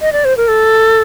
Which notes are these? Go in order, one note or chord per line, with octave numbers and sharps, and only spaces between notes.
D#5
D5
C5
A#4
A4